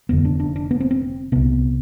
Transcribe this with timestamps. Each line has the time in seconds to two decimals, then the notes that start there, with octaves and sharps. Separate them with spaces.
0.09 F1 F2 D3 B3
0.25 D4
0.40 D4
0.56 D4
0.71 B3
0.80 C4
0.91 C4
1.32 C2 C3 B3